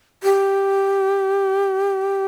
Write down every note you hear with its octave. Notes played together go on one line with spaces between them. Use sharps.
G4